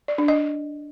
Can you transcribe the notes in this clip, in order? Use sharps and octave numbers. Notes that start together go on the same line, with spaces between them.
D5
D4
D#5